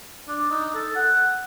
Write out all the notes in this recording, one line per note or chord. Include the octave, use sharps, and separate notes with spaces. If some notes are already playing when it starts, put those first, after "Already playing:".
D4
D#4
A4
F#5